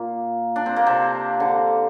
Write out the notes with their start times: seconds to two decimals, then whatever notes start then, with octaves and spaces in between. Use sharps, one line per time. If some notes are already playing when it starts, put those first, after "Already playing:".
Already playing: A#2 A#3
0.56 D4
0.66 C4
0.76 A#3
0.86 C3 C4
1.40 D3